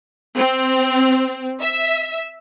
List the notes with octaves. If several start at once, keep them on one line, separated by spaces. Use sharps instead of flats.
C4
E5